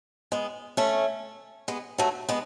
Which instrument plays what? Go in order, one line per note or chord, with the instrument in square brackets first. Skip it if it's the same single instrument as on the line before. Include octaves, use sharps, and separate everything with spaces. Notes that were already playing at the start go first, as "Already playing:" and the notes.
[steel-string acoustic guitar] G#3 B3
A3 C#4
G#3 B3
F#3 A3
G#3 B3